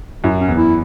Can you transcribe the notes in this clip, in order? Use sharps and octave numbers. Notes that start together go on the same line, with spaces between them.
F#2 E4
C#4
E2
E4